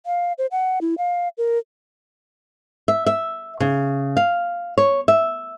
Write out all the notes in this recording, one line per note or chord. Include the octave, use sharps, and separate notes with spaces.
F5
C5
F#5
E4
F5
A#4
E5
E5
C#3
F5
C#5
E5